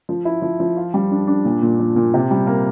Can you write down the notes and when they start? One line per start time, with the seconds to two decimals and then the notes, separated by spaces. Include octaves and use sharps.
0.09 F3
0.25 E4
0.42 F3
0.60 F3
0.77 F4
0.94 G3
1.11 D4
1.27 D4
1.45 A#2
1.62 A#2
1.80 F3
1.96 A#2
2.14 C3
2.31 G3
2.47 A#3